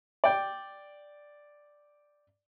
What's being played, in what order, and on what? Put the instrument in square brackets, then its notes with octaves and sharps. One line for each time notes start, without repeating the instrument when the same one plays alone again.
[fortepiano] D5 G5